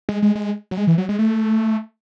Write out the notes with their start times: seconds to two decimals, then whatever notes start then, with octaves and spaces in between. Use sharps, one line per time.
0.09 G#3
0.22 G#3
0.35 G#3
0.71 F#3
0.77 G#3
0.87 E3
0.98 F#3
1.09 G#3
1.19 A3